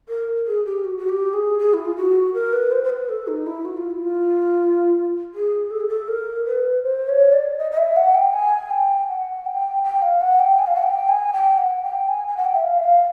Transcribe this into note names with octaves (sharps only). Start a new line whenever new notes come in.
A#4
G#4
G4
F#4
F#4
G4
G#4
G#4
E4
F4
F#4
A#4
B4
C5
C5
B4
A4
D#4
E4
F#4
F4
E4
F4
G#4
A4
G#4
A4
A#4
B4
C5
C#5
D5
D#5
D#5
E5
F#5
G5
G#5
G5
F#5
G5
G5
F5
F#5
G5
G#5
F5
F#5
G5
G#5
G5
F#5
G5
G#5
G#5
F#5
G5
E5
F5
E5
F5